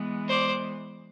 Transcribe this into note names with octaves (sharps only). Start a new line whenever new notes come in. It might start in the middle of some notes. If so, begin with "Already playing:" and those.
Already playing: E3 G#3 B3
C5 D5